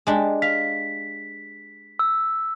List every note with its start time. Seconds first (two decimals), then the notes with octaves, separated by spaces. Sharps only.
0.07 G#3 D4 G4
0.42 F5 B6
1.99 E6